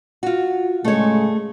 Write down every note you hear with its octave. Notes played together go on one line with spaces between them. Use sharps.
F4 F#4
A2 C#3 G#3 A3 C#5